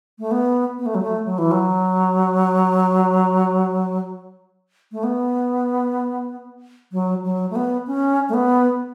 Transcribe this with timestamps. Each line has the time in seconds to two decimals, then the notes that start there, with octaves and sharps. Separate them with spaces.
0.19 A3
0.31 B3
0.79 B3
0.86 A3
0.95 F#3
1.03 A3
1.25 F#3
1.38 E3
1.51 F#3
4.92 A3
5.03 B3
6.92 F#3
7.24 F#3
7.51 A3
7.56 B3
7.87 C#4
8.29 A3
8.34 B3